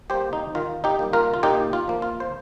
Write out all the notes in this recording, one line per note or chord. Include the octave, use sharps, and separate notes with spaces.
G3 A#3 G4 C5
D#4
D#3 F4
D#4 G4
G3 A#3
F4 A#4
F4
A#2 D#4 G4
F4
F3 A#3
F4
C5